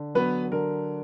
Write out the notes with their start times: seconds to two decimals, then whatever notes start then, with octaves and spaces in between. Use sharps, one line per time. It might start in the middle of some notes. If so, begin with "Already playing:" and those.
Already playing: D3
0.15 F#3 B3 B4
0.52 D3 A#4